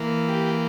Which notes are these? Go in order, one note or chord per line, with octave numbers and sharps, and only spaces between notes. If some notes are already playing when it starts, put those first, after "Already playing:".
Already playing: E3 A#3
G4